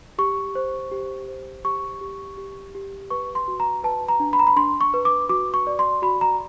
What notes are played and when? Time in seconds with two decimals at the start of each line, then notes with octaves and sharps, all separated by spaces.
0.18 G4 C#6
0.55 C5
0.91 G4
1.28 C5
1.65 G4 C#6
2.01 G4
2.37 G4
2.75 G4
3.10 B4 C#6
3.35 C6
3.48 F#4
3.60 A#5
3.84 B4 A5
4.09 A#5
4.20 D4
4.33 B5
4.39 A#5
4.47 B5
4.56 D4 C6
4.81 C#6
4.94 B4
5.05 D6
5.29 F#4 D6
5.54 C#6
5.67 D5
5.79 C6
6.02 F#4 B5
6.21 A#5